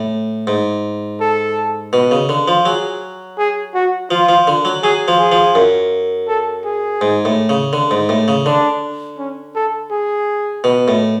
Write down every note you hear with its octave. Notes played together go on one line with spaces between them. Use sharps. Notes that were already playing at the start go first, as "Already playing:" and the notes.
Already playing: A2
G#2
A4
B2
C#3
D3
F3
F#3 G#4
G#4
F#4
F3 F4
F3
D3
F#3
F#3 G#4
F3
G#4
F3
F#2
A4
G#4
G#2
A2
C#3
D3
G#2
A2
C#3
D3 D4
C#4
A4
G#4
B2
A2